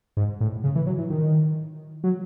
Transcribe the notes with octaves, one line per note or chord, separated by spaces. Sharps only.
G#2
A2
C#3
E3
F#3
E3
D#3
F#3